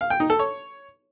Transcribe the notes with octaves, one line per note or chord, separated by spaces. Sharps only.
F5
G5
D#4
A4
C#5